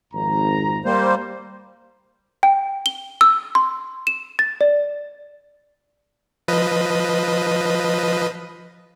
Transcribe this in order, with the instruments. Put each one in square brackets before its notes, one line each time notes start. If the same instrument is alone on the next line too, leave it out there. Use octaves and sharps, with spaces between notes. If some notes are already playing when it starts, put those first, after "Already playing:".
[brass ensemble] G#1 F2 A#5
[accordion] G3 A#3 C5
[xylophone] G5
G7
E6
C6
E7
A6
D5
[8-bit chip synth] F3 B4 D#5